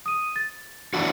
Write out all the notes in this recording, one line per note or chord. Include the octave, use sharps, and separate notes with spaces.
D#6 D#7
A6
E3 D4 F#4